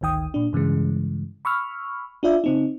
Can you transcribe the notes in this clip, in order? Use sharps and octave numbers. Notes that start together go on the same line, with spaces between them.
G#1 D2 D#3 G5 D#6
A#2 D4
G2 C#3 E3 G#3
B5 C#6 E6 F6
D4 F4 D5 E5
C#3 C4 D#4